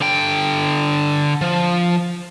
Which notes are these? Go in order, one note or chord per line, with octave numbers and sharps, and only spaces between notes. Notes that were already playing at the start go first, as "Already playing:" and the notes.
D3 G5
F3